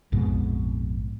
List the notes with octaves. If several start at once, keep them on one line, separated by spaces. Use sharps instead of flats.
A#1 F2 G#2 B2